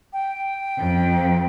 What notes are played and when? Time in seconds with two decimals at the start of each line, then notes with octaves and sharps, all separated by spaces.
0.13 G5
0.77 F2